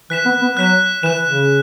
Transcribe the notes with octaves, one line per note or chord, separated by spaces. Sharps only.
E3 F#6 B6 E7
B3
B3
F#3 F#6 B6 E7
E3 F#6 E7
C#3